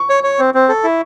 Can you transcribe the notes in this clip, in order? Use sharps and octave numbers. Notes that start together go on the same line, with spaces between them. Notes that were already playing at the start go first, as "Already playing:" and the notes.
Already playing: C#6
C#5
C#5
C4
C4
A4
E4